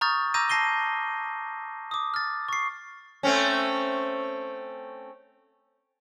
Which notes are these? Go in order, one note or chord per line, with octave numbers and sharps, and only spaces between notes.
A#5 C#6 D#6 F6 G6 A6
A#5 D6 E6 G6 A#6 D#7
A5 A#6 C7 D#7 G7
D6 D#6
F6 A6
C#6 C7
A3 C4 C#4